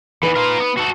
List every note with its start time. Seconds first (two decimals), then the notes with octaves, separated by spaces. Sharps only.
0.23 E3 B3 D#4 B4
0.36 F4 A#4
0.60 B3
0.78 F#4 A4